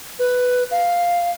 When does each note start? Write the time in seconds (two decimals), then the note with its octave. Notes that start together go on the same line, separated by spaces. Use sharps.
0.19 B4
0.71 F5